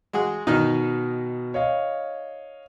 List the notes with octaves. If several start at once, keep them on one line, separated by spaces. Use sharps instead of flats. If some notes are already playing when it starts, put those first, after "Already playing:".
G#3 F#4 G#4
B2 D#3 D#4
C#5 D#5 F5